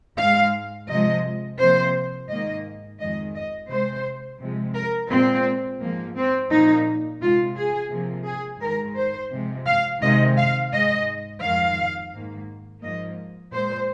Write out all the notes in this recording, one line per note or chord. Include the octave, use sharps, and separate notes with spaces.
G#2 G#3 F5
C3 F3 G#3 D#5
C3 F3 A#3 C5
G#2 D#3 A#3 D#5
F2 D#3 G#3 D#5
D#5
C3 G#3 C5
C3 F3 G#3
A#4
A#2 G#3 C4
G#2 F3 A#3
C4
A#2 F3 A#3 D#4
C3 G#3 F4
G#4
C3 F3 A#3
G#4
G#2 D#3 G#3 A#4
C5
C3 F3 G#3
F5
C3 D#3 G#3 D#5
F5
G#2 G#3 D#5
F2 D#3 G#3 F5
G#2 D#3 A#3
G#2 F3 A#3 D#5
A#2 G#3 C5